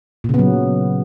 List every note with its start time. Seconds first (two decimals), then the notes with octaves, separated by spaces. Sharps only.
0.24 A#2
0.29 C#3
0.34 B3
0.39 F#3